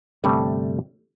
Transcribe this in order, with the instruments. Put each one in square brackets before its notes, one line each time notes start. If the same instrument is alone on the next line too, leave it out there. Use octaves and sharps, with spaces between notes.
[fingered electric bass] G1 C3 [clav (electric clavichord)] G3 A3